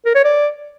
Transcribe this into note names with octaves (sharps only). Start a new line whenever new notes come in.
A#4
C#5
D5